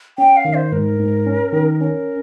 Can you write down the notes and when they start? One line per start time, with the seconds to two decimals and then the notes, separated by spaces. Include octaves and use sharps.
0.18 C#4 G5
0.36 F5
0.45 D#3
0.54 C5
0.72 G#2 A#4
0.99 G#2
1.26 C#4
1.53 D#3
1.80 C#4 A#4